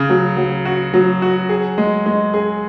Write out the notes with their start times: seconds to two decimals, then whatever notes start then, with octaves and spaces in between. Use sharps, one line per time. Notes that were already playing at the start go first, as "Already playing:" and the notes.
Already playing: C#3
0.10 F#3
0.37 F#3
0.65 F#4
0.94 F#3
1.22 F#4
1.49 G#4
1.78 G#3
2.06 G#3
2.34 G#4